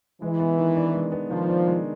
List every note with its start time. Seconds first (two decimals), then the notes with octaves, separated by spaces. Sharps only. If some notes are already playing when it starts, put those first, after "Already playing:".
0.22 E3 G#3
0.40 B3
0.58 D#3
0.75 D4
0.94 G#3
1.12 B3
1.30 D#3 F3
1.48 D4
1.67 G#3